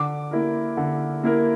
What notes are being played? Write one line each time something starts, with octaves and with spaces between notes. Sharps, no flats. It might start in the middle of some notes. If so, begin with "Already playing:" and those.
Already playing: D3 D6
A#3 E4 A#4
D3
A#3 E4 A#4